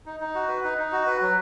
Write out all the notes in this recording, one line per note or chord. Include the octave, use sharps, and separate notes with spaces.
D#4
D#4
F#4
B4
D#4
D#4
F#4
B4
F#3